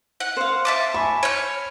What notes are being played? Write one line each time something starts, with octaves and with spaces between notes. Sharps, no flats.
F#5
C5 F5
E5 A5 D6
G#5 B5 C#6
C#5 F6